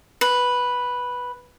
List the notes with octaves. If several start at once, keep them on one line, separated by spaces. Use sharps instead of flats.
B4